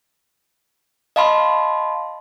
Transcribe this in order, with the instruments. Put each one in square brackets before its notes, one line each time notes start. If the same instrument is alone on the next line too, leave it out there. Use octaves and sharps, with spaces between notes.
[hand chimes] D#5 F5 A5 B5 C6